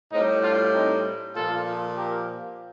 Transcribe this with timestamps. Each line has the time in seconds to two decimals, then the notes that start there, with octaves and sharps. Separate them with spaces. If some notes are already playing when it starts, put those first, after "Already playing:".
0.12 A2 C4 D#4
0.17 G3
0.43 D4 F4
0.73 C4 D#4
1.35 A#2 F3 F4 A4
1.97 G4 A#4